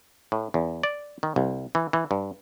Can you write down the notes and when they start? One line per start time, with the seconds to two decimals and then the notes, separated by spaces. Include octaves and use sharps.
0.32 A2
0.54 E2
0.83 D5
1.23 D#3
1.36 C2
1.75 E3
1.93 E3
2.11 G2